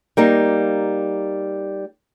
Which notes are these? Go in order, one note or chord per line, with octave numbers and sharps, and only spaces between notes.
G3 A#3 D#4